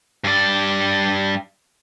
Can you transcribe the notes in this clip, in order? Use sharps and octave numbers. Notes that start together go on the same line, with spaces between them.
G2 D5